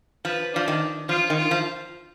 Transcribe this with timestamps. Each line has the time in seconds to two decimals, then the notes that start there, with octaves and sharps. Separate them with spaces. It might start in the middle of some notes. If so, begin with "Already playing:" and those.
0.25 F3 B4
0.53 F3 D4
0.68 D#3
1.09 F3 F4
1.30 D#3
1.37 F4
1.51 F3